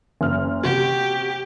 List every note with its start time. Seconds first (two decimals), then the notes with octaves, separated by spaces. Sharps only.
0.21 F#1 F6
0.63 C3 F#4 G4